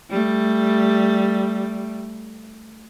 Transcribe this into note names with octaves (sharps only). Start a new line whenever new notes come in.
G3 A3